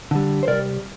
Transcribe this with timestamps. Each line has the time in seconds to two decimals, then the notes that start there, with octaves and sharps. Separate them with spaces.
0.11 D3 G3
0.43 C5
0.48 C3 G3 A#4 D5